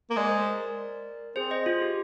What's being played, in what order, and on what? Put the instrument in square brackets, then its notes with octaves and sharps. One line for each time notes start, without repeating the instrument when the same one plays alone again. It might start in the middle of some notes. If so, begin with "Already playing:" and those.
[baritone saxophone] A#3
[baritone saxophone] G#3 [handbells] D5
[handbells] C5
A#4 D5
[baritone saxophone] C4 [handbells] G#4 C5
[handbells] C5 D#5
F4
G4